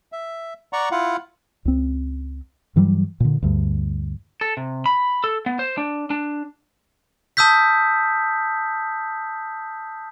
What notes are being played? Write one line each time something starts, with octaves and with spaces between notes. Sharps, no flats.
E5
D5 F#5 A#5 C#6
E4 F4 F5 F#5
C#2 C4
G2 E3 F#3 G3
A#2 D3
D2 G2
A4
C3
B5
A4
B3
C5
D4
D4
A5 D#6 E6 G6 B6